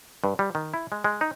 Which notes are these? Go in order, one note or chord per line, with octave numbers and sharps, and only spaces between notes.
G2
G3
D#3
E4
G#3
G#3
D#4